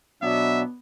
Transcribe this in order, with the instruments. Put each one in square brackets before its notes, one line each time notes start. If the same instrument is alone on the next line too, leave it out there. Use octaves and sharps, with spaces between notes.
[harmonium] B2 F#3 D4 [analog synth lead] B3 [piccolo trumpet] E5